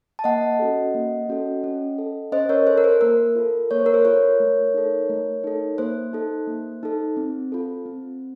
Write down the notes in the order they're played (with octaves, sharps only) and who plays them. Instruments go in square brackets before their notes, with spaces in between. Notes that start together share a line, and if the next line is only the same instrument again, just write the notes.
[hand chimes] A5
A#3 D#5 F#5
C#4 F#4 A4
A#3
C#4 F#4 A4
C#4
A4
C#4 C5 D#5
A#4 C#5
A4 C5
A#4
C5
A#3 A#4
F4 A4
A#3 C#5
C5
A#4
C5
F4 A4 A#4 C#5
A3
D#4 A4
A3
D#4 A4
A#3 C5
D#4 A4
A#3
D#4 A4
C4
F4 A4
C4